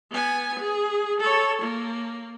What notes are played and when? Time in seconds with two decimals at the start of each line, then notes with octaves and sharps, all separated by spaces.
0.11 B3 G#5
0.59 G#4
1.20 A4 C#5
1.61 A#3